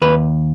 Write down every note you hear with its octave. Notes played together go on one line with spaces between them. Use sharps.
D#2 B4